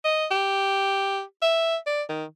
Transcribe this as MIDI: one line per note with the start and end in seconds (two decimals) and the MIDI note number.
0.05 0.26 75
0.31 1.22 67
1.42 1.76 76
1.87 2.02 74
2.09 2.24 51